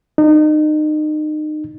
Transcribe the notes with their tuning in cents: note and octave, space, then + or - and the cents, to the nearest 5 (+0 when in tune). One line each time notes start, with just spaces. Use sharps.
D#4 -30